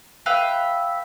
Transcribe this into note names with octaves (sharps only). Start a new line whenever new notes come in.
B4 E5 F5 G5